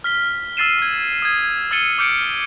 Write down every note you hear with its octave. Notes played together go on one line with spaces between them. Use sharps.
F6 B6 G7
E6 F6 A6 C7 D#7 E7
G#6
D#6 G#6
E6 F6 A6 C#7 D#7 G7
D6 F6 G6 C#7 D7